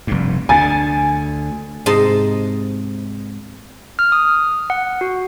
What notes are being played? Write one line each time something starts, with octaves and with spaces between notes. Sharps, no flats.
F1 G2
D2 D3 G#5 A6
G#2 C3 D#5 A5 C6
F6
D#6
F#5
F#4